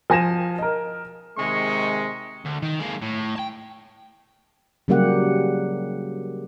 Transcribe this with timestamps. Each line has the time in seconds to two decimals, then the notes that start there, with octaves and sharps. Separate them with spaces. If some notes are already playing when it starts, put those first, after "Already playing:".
0.10 F3 G#5 A#6 E7
0.59 A#4 D#5
1.37 C3 D#3 G#3 C#6
2.45 D2
2.62 D#3
2.80 G#3 A#3
3.02 A2
3.36 G5 A5
4.88 C#3 F#3 G3 A#3 G4 F#5